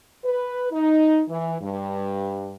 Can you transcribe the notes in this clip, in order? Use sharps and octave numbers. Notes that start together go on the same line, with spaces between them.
B4
D#4
E3
G2